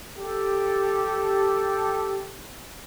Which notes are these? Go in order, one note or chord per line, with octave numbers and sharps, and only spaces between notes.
G4 A4